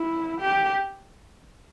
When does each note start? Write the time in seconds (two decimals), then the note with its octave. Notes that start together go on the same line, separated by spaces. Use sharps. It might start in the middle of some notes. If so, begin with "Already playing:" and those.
Already playing: E4
0.41 G4